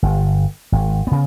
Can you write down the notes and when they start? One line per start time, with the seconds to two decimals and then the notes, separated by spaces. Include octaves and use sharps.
0.02 G1
0.72 G#1
1.07 C#3 B3